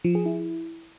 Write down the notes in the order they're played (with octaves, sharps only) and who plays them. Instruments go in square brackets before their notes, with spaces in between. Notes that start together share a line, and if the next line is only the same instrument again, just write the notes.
[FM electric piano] F3
G#4
E4